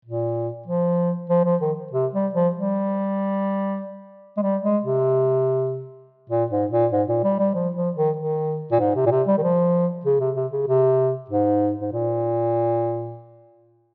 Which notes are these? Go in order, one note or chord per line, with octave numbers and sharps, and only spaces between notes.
A#2
F3
F3
F3
D#3
C3
G3
F3
G3
G#3
G3
G#3
C3
A#2
G#2
A#2
G#2
A#2
G3
G3
F3
F3
D#3
D#3
A#2
G#2
C3
A#2
C3
G3
D#3
F3
C#3
C3
C3
C#3
C3
G#2
G#2
A#2